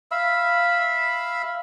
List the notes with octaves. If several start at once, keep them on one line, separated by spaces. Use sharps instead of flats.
E5 F5 B5 E6